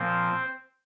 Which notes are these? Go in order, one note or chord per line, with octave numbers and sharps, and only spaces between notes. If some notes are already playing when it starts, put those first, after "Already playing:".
Already playing: A#2 F3 A#3 C4 C5